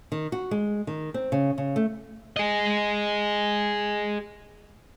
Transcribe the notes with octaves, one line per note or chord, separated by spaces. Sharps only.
D#3
F#4
G#3
D#3
C4
C#3
C#3
A3
G#4 D#5